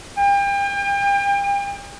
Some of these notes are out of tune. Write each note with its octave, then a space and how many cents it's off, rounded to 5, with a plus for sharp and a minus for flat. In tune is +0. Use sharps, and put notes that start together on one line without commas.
G5 +35